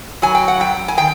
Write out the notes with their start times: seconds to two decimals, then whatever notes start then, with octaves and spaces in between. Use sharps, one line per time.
0.22 F#3 G#5
0.35 G5
0.48 F#5
0.60 F#2 G5
0.88 G#5
0.97 D#3 G5